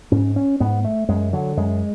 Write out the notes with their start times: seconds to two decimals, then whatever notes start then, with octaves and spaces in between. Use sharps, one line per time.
0.12 G#2 C#4
0.36 C#4
0.60 G#2 B3
0.84 A3
1.09 F#2 G#3
1.33 D3 F#3
1.57 F#2 G#3